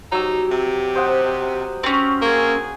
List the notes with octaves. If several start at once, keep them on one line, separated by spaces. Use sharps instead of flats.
F#3 D#4 G4 E6
C3
C5 D#5 F#5
C4 C#4
A#3 G#4 G#5